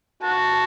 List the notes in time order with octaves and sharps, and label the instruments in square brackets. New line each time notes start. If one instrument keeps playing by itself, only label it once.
[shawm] F#4 [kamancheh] A5